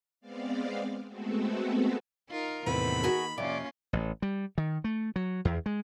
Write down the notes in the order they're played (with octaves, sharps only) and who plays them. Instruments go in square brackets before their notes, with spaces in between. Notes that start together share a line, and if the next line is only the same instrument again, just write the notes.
[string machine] G#3 B3 C4 D5 F5
G#3 A3 B3 C4 F#4 A4
[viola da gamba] D#4 F4 A#4
[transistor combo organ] E2 A2 C3 [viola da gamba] D#3 A#3 [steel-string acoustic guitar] B3 B4 [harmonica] B5
[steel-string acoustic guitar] F#4 G#4 A#4
[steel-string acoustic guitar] F2 C3 [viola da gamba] A#3 C#4 F4 [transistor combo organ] D5
[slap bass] A1
G3
D#3
A3
F#3
E2
G#3